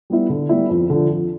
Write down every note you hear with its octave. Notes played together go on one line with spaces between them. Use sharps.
G3 B3 E4
D3
G3 B3 E4
F2
D3 F3
F2